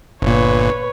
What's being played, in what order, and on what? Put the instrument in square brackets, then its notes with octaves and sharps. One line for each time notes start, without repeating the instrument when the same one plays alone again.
[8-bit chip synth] G1 A#2 [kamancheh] B4 C#5